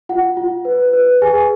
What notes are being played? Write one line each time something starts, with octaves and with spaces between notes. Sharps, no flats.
F4 F#5
F4
B4
B4
G#4 G#5